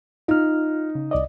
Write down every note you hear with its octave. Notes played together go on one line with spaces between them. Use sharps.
D#4 F4 F6
C#3
C2 D5 D#5